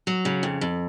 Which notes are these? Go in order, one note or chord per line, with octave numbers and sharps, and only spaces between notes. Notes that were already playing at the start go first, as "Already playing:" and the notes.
F#3
C#3
F2
F2